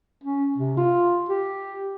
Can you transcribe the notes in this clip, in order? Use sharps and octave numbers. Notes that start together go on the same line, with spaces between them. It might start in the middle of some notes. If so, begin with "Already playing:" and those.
C#4
C3
F4
G4